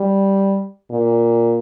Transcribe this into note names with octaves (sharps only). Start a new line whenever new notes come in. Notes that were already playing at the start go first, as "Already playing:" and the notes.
Already playing: G3
A#2